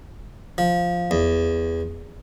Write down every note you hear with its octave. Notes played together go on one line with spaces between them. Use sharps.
F3
E2